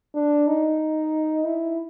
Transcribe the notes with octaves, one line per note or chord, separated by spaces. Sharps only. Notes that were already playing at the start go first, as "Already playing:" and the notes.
D4
D#4
E4